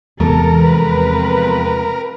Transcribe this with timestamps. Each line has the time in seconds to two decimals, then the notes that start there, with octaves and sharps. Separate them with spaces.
0.20 E2 C3 G#3 A3 A4 A#4
0.62 F3 C4 B4